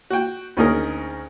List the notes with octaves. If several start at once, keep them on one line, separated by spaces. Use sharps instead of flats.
F#4 G5
D2 C#4 D#4 G#4 A#4 D#6